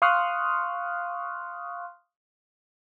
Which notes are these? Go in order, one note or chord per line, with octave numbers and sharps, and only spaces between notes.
F5 C6 C#6 D#6 F6 F#6